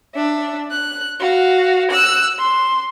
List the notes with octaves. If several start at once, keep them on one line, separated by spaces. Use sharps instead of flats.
D4 E5
F#6
F#4 F5
E6 F#6
C6